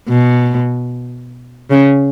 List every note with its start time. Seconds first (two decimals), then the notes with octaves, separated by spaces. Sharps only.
0.09 B2
1.71 C#3